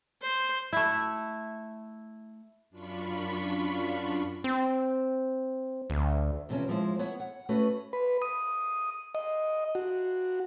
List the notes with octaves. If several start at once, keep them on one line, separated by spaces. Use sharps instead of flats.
C5
A3 E4
F#2 D4 F4 B5 C#6 B6
C4
D2
E2 C3 F3 C4 C#4
D#2 F3 G#3 E4 C5
B3 E4 C#5 F#5
F#5
A3 C#4 F#4 B4 C#5
B4
D#6
D#5
F#4